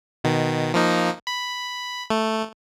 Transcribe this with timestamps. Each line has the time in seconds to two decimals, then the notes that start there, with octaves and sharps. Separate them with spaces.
0.24 B2 D#3
0.74 F3 A#3 D#4
1.27 B5
2.10 A3